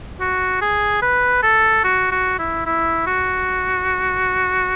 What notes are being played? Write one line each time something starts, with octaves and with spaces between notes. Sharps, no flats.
F#4
G#4
B4
A4
F#4
F#4
E4
E4
F#4